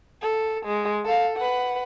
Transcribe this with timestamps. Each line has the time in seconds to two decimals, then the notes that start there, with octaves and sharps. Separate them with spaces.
0.22 A4
0.66 G#3
1.05 A4 F5
1.36 B4 F#5